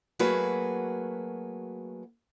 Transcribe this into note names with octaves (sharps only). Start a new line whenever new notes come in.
F#3 A3 A#3 F#4 G#4 B4